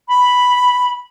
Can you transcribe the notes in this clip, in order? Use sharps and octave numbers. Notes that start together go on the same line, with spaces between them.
B5